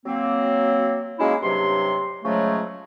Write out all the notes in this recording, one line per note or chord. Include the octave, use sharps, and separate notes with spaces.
F#3 A#3 C4
F#3 G#3 A#3 C#4 D#4 E4
G2 C3 F#3 C6
C#3 F3 F#3 G#3 A3